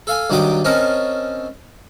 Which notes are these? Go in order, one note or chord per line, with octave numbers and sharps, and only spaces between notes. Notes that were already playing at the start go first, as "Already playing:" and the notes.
A4 F5 G#5
G2 D#3 F#3 G5 D6 D#6
C4 C#4 A#4 D#5 A5